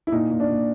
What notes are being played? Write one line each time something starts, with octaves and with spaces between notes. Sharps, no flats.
E4
A#2 D#4
A#2
D4
A#2